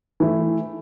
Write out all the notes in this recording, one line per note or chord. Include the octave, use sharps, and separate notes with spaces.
E3 A3 E4